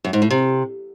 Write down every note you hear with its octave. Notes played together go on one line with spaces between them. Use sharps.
F#2
G#2
A2
C3